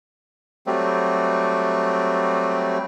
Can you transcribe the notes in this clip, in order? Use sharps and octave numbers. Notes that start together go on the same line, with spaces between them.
F#3 G3 A3 C4